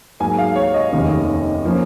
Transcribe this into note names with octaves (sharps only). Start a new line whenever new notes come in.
G#2 F#3 A#3 G#5
F5
C#5
D#5
F1 D#2 D#3 A#3 C#4
F3 A#3 C#4